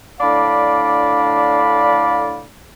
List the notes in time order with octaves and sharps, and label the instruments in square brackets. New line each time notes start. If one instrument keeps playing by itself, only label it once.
[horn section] A2 D3 D4 D5 F5 B5